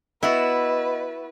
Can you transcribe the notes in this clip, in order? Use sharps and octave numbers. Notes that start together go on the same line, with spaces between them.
B3 E4 F#4 B4 D#5 E5